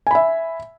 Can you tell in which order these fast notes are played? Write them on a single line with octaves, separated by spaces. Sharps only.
G#5 B5 E5